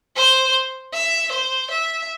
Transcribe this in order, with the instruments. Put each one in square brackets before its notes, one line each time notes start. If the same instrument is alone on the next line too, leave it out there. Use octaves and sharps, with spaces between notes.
[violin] C5
E5
C5
E5